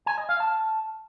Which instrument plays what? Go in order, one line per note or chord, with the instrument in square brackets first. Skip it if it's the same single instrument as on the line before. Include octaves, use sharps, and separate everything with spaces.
[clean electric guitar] G#5
D#5
F5
A5